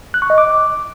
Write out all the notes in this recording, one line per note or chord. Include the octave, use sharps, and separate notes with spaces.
F#6
C#6
D#5
D6